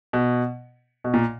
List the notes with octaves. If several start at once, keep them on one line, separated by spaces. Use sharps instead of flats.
B2
B2
A#2